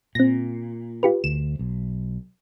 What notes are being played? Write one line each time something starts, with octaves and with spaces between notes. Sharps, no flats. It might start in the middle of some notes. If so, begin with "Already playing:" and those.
A#2 C4 A#6
F4 G4 B4
D2 E7
B1